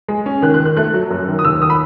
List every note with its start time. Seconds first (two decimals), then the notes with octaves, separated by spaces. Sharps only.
0.08 G#3
0.26 C#4
0.42 D#3 F#6
0.54 F#6
0.60 D#3
0.65 F#6
0.77 A3 F#6
0.94 F#3
1.11 F#2
1.28 D#3
1.39 D#6
1.45 D#2 E6
1.61 D#3 D#6
1.70 B5